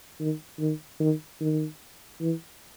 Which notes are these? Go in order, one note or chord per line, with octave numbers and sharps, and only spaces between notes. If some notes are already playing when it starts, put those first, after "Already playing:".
D#3
D#3
D#3
D#3
E3